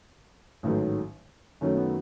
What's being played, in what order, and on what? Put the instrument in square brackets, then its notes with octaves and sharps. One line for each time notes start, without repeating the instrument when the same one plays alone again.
[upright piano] A1 G#2 D#3 F#3 A3
F#2 D#3 F#3 A3 C#4
B3